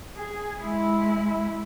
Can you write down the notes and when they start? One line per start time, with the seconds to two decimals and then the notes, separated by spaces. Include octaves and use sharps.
0.17 G#4
0.62 G#3 E4